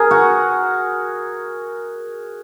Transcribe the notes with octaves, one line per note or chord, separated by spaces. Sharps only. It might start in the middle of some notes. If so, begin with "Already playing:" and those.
Already playing: G#4 A#4
F#4